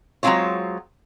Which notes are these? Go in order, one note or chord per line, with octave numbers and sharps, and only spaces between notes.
F#3 G#3 A3 C4 F4 C#5